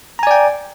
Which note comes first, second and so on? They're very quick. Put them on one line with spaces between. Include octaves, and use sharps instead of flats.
A#5 G#5 D5 G5